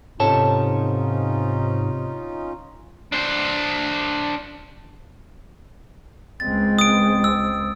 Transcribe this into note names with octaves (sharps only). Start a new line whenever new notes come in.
G#2 C3 C#4 D#4 F4 A4 C#5 A5
D4 C5
C#2 G#3 C4 A6
D#6 D7
E6